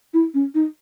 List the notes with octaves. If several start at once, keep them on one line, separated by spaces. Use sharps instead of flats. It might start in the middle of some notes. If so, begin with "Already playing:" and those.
E4
C#4
D#4